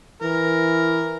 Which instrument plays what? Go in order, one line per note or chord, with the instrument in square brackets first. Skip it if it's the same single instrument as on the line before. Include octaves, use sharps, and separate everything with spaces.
[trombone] E3 [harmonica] A#4